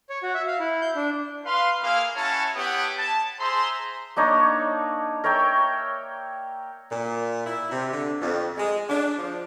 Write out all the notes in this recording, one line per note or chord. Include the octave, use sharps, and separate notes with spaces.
C#5
F#4
E5
F5
E4
G6
D4
B4 F5 C6
A#3 E4 G#4 F5
C#4 E4 F#4 C#5 A5
B3 E4 G4 C#5 F#5 D#6
A5
G#4 C5 E5 A#5 C6
A#3 D4 D#4 C#5
A#4 C#5 E5 G5
A#2
E4
C3
D3
F2
G#3
D4
F3